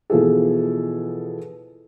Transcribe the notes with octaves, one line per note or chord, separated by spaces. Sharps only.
B2 E3 F3 G#4 A4